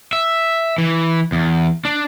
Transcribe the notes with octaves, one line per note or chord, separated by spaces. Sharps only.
E5
E3
E2
D4